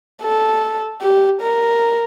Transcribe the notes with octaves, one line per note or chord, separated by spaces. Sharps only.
A4
G4
A#4